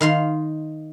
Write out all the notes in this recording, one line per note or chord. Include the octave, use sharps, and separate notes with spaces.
D#3 F5 C6